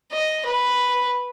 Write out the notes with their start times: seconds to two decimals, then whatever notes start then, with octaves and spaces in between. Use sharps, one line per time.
0.12 D#5
0.45 B4